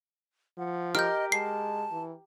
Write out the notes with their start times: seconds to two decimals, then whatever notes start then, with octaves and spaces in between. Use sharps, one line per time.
0.58 F3 F#5
0.95 G4 A#4 D#5 F6 G6
1.32 G#3 A5 C7
1.91 E3